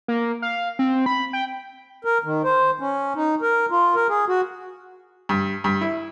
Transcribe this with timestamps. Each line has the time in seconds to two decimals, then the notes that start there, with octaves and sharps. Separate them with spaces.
0.08 A#3
0.42 F5
0.79 C4
1.06 B5
1.33 G5
2.05 A#4
2.24 D#3
2.44 C5
2.80 C#4
3.16 D#4
3.42 A#4
3.70 F4
3.95 A#4
4.09 G#4
4.28 F#4
5.29 G2
5.64 G2
5.81 E4